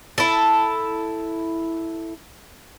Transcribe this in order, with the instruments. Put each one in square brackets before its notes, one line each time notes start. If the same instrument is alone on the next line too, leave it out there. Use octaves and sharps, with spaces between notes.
[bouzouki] E4 A4